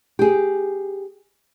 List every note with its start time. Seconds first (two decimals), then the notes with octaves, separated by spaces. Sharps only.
0.19 G4 G#4